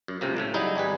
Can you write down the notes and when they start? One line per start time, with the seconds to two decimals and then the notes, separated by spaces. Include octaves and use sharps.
0.08 F#2
0.21 C#2 F#2 C3 A#3
0.37 A2 C#3 A3
0.54 C#3 F#3 G3 D#4 E4
0.76 G#1 G3 G#4 B4